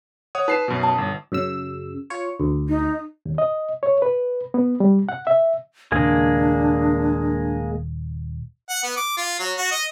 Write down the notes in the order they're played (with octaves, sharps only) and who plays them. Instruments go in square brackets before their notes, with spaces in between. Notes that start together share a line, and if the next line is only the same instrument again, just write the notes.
[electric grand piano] C#5 F#5 D#6
[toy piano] D#4 [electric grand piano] B4 C7 E7
[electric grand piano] F#2 B2
[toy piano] A5
[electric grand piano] G1
[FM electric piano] F#2 C#3 E6
F4 C#5
D2
[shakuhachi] D#4
[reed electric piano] D#2
D#5
C#5
B4
B3
G3
F#5
E5
[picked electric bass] D#1 C#3 [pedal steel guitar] G#3 A#3 G#4 [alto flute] D4
[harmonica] F#5
B3
D6
F4
F#3
F#4
D#5